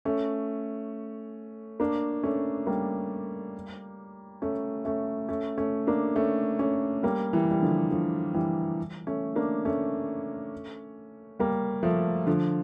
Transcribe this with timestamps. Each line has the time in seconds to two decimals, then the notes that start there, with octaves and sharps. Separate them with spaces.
0.05 A3 C#4
1.80 A#3 D4
2.23 A3 C#4
2.67 G3 A#3
4.42 A3 C#4
4.85 A3 C#4
5.29 A3 C#4
5.58 A3 C#4
5.87 A#3 D4
6.16 A3 C#4
6.59 A3 C#4
7.03 G3 A#3
7.33 E3 G3
7.51 G3
7.62 D3 F3
7.91 D3 F3
8.34 E3 G3
9.07 A3 C#4
9.36 A#3 D4
9.65 A3 C#4
11.39 G3 A#3
11.83 F3 A3
12.27 D3 F3